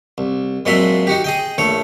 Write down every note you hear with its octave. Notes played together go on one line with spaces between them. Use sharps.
C2
F2 A#2 F#3 G#3 E5 C6
D#4 F#4 G4
G#4 D#5 G5
A#1 A3 C#5